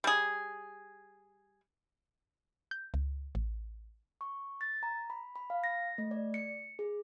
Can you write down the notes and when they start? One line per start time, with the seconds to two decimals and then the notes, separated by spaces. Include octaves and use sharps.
0.04 G3 G#4
2.71 G6
2.94 C#2
3.35 A1
4.21 C#6
4.61 A6
4.83 A#5
5.10 B5
5.36 B5
5.50 F5
5.64 A#6
5.98 A3
6.11 D5
6.34 C#7
6.79 G#4